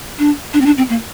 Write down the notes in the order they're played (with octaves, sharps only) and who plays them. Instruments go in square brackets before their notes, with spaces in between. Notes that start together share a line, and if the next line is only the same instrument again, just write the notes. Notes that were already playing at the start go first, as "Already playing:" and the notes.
[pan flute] D4
D4
C4
D4
C4
A#3